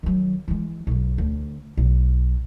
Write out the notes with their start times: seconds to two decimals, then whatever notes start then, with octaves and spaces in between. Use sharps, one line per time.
0.03 D#3 F#3
0.48 E3 G#3
0.87 B1 F#2
1.18 D2
1.77 B1